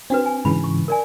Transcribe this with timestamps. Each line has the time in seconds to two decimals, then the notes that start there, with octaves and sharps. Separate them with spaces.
0.10 C4 D4 F#4 B4
0.26 G#5
0.45 G#2 C#3 E3 B5
0.64 C#6
0.88 A#4 D5 G#5